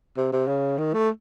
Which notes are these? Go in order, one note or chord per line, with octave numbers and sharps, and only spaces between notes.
C3
C3
C#3
D#3
A3